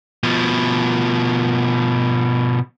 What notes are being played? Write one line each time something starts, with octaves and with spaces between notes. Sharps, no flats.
B2 F3